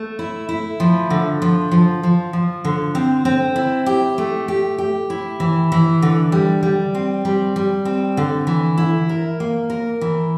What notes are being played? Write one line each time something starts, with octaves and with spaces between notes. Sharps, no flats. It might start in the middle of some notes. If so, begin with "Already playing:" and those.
Already playing: A3
E4
E4
F3
D3
F3
F3
F3
F3
D3
C4
C4
E4
G4
A3
G4
G4
E4
E3
E3
D3
G3
G3
C4
G3
G3
C4
D3
E3
E4
A#4
A#3
A#4
E3